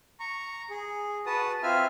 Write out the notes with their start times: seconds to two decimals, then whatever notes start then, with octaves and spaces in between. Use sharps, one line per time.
0.20 A#5 C#6
0.70 G#4
1.26 F#4 B4 A5 D#6
1.63 C4 F4 E5 G#5 F6